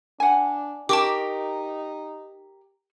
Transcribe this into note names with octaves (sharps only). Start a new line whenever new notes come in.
D4 F#5 G#5
D#4 G4 A#4 A5 C#6 D6